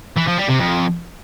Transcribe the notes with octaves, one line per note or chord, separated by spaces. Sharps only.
E3
F3
G3
C3
F2